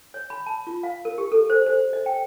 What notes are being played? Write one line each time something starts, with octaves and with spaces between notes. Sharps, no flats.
C#5
B5
A5
F4
F5
A#4
G4
A4
C5
C5
D#5
G5